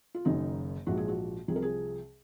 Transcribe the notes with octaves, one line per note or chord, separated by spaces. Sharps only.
F4
F#1 F#2 D#3 D#4
A#1 G#2 F3 F#4
G#4
F#4
C2 C3 F3 G#4
A#4
G#4